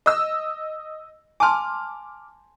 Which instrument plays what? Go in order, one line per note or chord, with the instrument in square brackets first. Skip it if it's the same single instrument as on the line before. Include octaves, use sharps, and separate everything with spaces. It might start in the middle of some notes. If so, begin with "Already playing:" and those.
[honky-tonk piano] D#5 E6
[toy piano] G#5 A5 C6 [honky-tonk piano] D6 F6